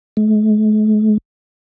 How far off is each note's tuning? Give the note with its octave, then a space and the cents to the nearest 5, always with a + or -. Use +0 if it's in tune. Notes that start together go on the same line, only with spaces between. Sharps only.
A3 -45